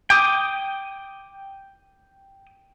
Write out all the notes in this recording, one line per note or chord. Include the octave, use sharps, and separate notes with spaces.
G5 D6 D#6